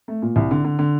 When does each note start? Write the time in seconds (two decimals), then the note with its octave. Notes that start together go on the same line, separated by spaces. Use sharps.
0.08 A3
0.22 A#2
0.36 C2
0.51 D3
0.64 D3
0.79 D3